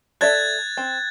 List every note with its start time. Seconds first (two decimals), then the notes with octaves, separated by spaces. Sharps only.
0.21 A4 D5 E5 F#6 G#6 A6
0.77 C4